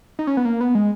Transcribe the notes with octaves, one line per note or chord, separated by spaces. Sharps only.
D#4
C#4
B3
A#3
B3
G#3